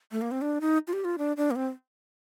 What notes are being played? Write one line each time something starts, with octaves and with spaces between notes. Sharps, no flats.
A3
A#3
C4
D4
D#4
F4
G4
F4
D4
D4
A#3
C4